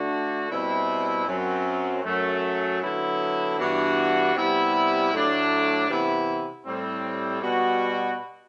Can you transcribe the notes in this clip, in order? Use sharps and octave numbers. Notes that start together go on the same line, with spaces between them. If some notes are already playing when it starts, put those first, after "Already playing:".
Already playing: D3 A3 D4 F#4
B2 G3 C4 E4
F#2 F#3 C4
F#2 F#3 A3
D3 F#3 B3 E4
G2 E3 B3 D4 F#4
C3 G3 B3 E4
A2 F#3 A3 D4
C3 E3 B3 E4
A2 G3 C4
B2 G3 B3 F#4